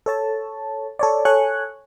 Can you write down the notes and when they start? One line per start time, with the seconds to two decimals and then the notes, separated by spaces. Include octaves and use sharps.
0.06 A4 C#5 A5
0.99 A4 C#5 D5
1.25 A4 C#5 G#5 C#6 F#6